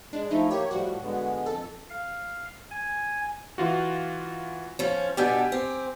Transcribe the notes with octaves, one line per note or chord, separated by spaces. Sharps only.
G#3 D4
F3 A3 D#4 E4
A#3 G4 C#5
A2 F3 G3 F#4
D3 G#3 B3
F2 A4
F5
G#5
E3 F4 F#4
F3 C#4
B2 D4 G4 A4 G#5 G6
C4